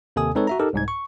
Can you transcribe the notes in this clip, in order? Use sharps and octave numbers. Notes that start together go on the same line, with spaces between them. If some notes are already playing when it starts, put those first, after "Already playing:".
D#2 C3 A4 G#5 D#6
G#3 C4 D#4 A4 B4 C#5
F#4 E5 A#5
D#4 G4 A4 A#4
C2 G#2 G#6
C#6